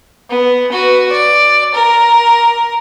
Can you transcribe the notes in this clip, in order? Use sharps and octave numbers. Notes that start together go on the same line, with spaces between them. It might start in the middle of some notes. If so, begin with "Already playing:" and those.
B3
F#4 B4
D5
A#4